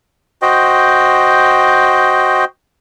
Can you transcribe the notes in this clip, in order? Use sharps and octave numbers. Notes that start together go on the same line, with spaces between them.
F#4 C5 D#5 G5